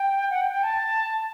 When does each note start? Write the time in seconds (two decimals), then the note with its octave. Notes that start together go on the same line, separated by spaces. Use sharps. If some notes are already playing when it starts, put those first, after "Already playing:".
Already playing: G5
0.30 F#5
0.41 G5
0.52 G5
0.63 A5